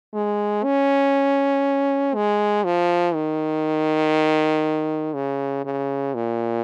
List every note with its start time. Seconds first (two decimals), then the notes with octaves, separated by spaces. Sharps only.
0.14 G#3
0.64 C#4
2.15 G#3
2.64 F3
3.15 D#3
5.14 C#3
5.65 C#3
6.15 A#2